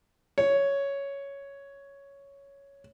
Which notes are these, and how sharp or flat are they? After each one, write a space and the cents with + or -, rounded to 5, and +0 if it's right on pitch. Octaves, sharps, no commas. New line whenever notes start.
C#5 +5